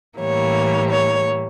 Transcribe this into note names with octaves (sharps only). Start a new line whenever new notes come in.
A2 E3 G3 A#3 C#5
C#5